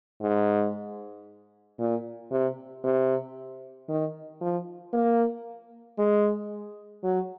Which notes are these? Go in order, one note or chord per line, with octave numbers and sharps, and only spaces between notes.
G#2
A#2
C3
C3
D#3
F3
A#3
G#3
F#3